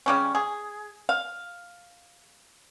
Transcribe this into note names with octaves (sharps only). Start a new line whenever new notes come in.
C#3 G3 C#4
G#4
F5